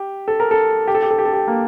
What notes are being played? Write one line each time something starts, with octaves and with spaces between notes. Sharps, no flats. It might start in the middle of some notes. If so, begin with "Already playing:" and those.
Already playing: G4
A4
A#4
A4
G4
A4
G4
A4
G4
A4
G4
A#3